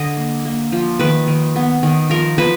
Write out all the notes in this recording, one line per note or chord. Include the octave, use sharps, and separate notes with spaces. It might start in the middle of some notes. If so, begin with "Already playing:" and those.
Already playing: D3 D#5
A#3
A#3
F3
D#3 B4
D#3
B3
D#3
F3 A#4
F3 B4